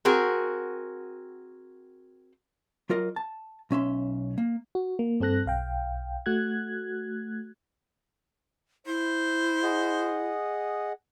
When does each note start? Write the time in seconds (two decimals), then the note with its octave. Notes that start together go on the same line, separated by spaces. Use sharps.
0.05 C4 F#4 G#4 A#4
2.90 F#3 F4 A#4 D#5
3.16 A5
3.71 B1 C#4 E5 C6
4.38 A#3
4.75 F#4
4.99 A#3
5.20 G2 C4 A4 F#6 A#6
5.46 B1 F5 G5
6.26 A3 F#4 F#6 G#6
8.87 E4 C5
9.63 G#4 D#5 F#5